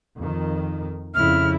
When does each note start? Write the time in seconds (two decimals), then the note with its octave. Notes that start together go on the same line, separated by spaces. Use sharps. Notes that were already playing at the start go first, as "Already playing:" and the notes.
0.16 F2 D#3
1.15 F2 C#3 E4 F6